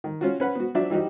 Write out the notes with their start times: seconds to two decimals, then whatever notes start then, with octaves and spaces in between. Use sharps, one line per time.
0.04 D#3
0.21 C#4 F4 F#4
0.40 C#4 B4 F#5
0.55 B3 F#4
0.75 F3 F#3 D4 F#4 D5 E5
0.90 E3 G3 D#4 F#4 G4